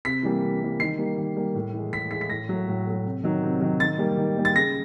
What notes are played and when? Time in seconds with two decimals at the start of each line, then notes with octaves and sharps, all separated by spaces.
0.05 C3 B6
0.23 E3 G3 A#3
0.43 C3
0.62 E3 G3 A#3
0.80 D#3 C7
0.98 G3 A#3
1.18 D#3
1.37 G3 A#3
1.55 A2
1.74 E3 G#3
1.92 A2 B6
2.11 E3 G#3 B6
2.21 B6
2.30 A2 A#6
2.49 F#3 A3
2.68 A2
2.86 F#3 A3
3.05 C3
3.24 D#3 F#3
3.43 C3
3.61 D#3 F#3
3.80 D#3 A6
3.99 G3 A#3
4.17 D#3
4.36 G3 A#3
4.45 A6
4.55 C#3 A#6